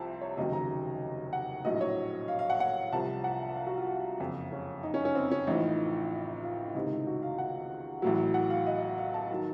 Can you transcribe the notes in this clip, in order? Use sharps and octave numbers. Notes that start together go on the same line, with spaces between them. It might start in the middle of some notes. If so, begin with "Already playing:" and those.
Already playing: C2 C3 F3 A5
C#5
F1 D#2 C#3 F#3 D#5
A#5
F#5
A#1 A2 F#3 D#5
C#5
F5
F5
F#5
F#5
C2 C3 F3 A5
F#5
F5
F#4
F4
F#1 F2 C#3
C#4
D#4
C#4
C#4
C4
C#4
A1 A2 F3 D#4
F4
C#2 C3 D#3 D#4
F#4
F5
F#5
A1 A2 F#3
F#5
F5
D#5
F5
A5
D#3 F#3